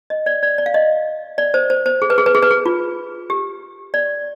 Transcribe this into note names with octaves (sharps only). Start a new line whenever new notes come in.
D#5
D5
D5
D5
F5
D#5
D5
C5
C5
C5
G#4
B4
G#4
B4
G#4
B4
G#4
F4
G4
D5